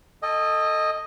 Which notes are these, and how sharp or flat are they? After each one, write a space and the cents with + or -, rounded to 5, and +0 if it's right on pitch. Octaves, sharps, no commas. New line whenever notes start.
A4 +10 D#5 +0 G#5 -45